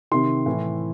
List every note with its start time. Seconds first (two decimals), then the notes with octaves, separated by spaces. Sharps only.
0.11 C3 D#3 C6
0.46 A2 E3